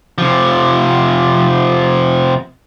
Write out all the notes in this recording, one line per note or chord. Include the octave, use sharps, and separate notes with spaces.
C3 F3